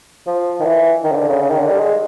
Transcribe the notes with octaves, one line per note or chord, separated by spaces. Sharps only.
F3
D#3
E3
D#3
C#3
D3
C#3
C#3
D#3
D3
G3
G#3